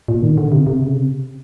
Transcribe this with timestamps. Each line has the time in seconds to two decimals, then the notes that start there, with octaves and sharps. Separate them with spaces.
0.08 A#2
0.23 D#3
0.38 D3
0.52 C3
0.67 C3
0.81 C#3
0.96 C3